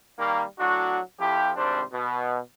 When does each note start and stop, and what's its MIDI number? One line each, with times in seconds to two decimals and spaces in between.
0.19 0.43 51
0.19 0.43 55
0.19 0.43 58
0.59 0.99 45
0.59 0.99 54
0.59 0.99 62
0.59 0.99 66
1.20 1.50 41
1.20 1.50 53
1.20 1.50 64
1.20 1.50 67
1.56 1.82 32
1.56 1.82 48
1.56 1.82 55
1.56 1.82 62
1.56 1.82 72
1.92 2.38 47